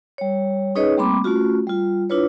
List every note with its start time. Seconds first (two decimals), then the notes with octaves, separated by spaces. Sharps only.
0.18 G3 C#5
0.75 C#4 D#4 G#4 B4 C#5 D#5
0.97 G3 A3 A#3 C4 B5 D6
1.24 A3 C#4 F4 F#4
1.67 G3 F4
2.10 D4 E4 F4 B4 C#5